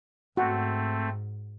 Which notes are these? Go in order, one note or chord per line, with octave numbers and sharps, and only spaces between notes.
G#2 A3 C4 F#4